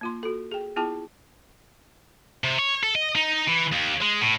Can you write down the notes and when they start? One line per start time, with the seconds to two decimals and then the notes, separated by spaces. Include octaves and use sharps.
0.01 A#3 F4 C6
0.23 F#4 A4
0.51 G#4 G5
0.76 B3 E4 F4 G#4 G5 A5
2.44 C3
2.59 C#5
2.83 A4
2.95 D#5
3.15 D#4
3.47 E3
3.72 D#2
4.01 G#3
4.21 A2